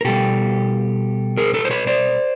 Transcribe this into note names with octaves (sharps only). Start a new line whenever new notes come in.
A#4
B2 G3 G4 A4
G#4 A#4
A4 B4
C5
B4 C#5
C5 D5